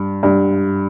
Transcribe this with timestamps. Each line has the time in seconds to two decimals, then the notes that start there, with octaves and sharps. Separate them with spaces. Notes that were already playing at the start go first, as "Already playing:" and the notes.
Already playing: G2
0.23 G2